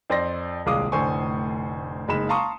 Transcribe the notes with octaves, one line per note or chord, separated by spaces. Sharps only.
F2 C5 D5 C6 A#6
D#1 C2 G#3 F5 D6 D#6
F1 A2 D3 C5 G#5 C#6
F#1 G#3 D#4 B5 E7
F5 A5 A#5 C6 C#6 D#6